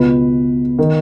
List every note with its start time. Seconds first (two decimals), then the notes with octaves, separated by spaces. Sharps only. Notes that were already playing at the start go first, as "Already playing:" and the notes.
Already playing: C#2 B2 B4
0.79 D#3